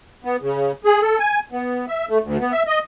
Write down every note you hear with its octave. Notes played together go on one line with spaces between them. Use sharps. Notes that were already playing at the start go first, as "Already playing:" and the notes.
B3
C#3
G#4
A4
G#5
B3
E5
A3
D2
B3
E5
D#5